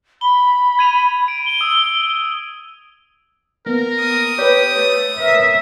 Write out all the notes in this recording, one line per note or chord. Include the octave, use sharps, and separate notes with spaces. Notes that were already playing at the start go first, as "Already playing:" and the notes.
B5 G7
G#6 D#7 F7
D7
G7
D#6 E6
A#3 B3 A#4
D#6
G4 B4 C#5
A3
A#4 E5